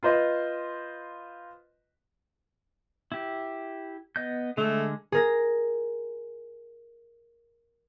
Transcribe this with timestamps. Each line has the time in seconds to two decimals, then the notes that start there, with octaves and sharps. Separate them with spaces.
0.03 F4 B4 C5 D#5
3.12 E4 G4
4.16 B3 D#5 G6
4.57 D3 G#3 A3
5.12 G#4 A#4 A#6